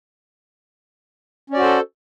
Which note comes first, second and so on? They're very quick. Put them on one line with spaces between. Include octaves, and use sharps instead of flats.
C#4 D5 F#4 C5 A4